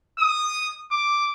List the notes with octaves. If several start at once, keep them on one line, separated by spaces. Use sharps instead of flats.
D#6
D6